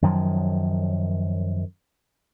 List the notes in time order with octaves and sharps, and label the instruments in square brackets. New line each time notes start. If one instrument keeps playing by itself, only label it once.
[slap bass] F#2 D#3 F3 F#3